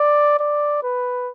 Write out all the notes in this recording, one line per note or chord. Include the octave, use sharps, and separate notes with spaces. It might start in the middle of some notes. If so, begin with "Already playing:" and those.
Already playing: D5
D5
B4